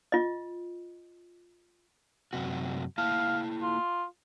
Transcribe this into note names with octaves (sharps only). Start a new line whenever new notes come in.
F4 D#5
F#2 C3 F#4
A#3 E4 F5 A5
F4